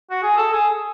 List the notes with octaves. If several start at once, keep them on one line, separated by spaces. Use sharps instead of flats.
F#4
G#4
A4
G#4